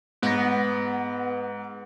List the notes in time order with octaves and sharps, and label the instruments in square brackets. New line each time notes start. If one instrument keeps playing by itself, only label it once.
[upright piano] G#2 A#6 [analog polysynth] B3